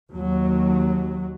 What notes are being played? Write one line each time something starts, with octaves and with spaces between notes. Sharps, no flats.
D#2 F#3